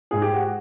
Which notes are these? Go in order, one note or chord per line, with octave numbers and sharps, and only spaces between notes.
G#2 G#4
G4
F#4